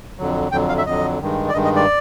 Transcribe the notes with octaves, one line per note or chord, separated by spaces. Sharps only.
F2 D3 F#3
F2 D3 F#3 G5
F5
E5
F2 D3 F#3 D#5
G2 D#3 G#3
D5
G2 D#3 G#3 D#5
D#5
D5